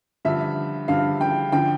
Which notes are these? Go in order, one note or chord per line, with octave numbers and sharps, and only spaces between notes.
G2 D3 F3 E5
G2 D3 F3 F5
G5
D3 F3 G5